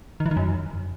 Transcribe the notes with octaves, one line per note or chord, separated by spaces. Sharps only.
D#3
E3
D#3
F#2